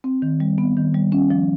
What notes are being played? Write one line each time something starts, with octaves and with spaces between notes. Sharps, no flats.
C4
D#3
G3
B3
D#3
G3
C#4
F3